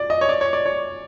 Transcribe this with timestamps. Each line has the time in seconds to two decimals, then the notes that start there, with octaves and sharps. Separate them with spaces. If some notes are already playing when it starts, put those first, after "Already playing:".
Already playing: D5
0.10 D#5
0.21 C#5
0.29 D5
0.41 C#5
0.53 D5
0.66 C#5